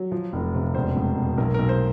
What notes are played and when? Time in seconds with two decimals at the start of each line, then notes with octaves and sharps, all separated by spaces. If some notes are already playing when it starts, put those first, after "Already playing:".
Already playing: F#3
0.12 F3
0.33 F1
0.54 C3
0.75 E1 C5
0.97 E1
1.18 B2
1.37 B1 A#4
1.54 B1 A#4
1.69 C5